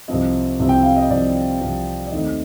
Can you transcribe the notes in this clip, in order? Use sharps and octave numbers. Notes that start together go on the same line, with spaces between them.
C2 C3 F3 C4 D#5
C2 C3 F3 C4
G5
F5
D#5
C2 C3 F3 C4 D5
C2 C3 F3 C4
D5
D#2 D#3 A3 C4 D#5